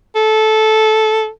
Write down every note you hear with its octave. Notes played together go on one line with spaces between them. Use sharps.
A4